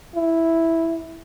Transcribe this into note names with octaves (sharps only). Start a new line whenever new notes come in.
E4